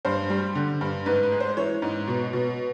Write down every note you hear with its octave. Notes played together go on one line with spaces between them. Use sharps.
G2 C5
G3
D3
G2
G#2 B4
B4
G#3
C5
E3 C#5
G#2
B2
B2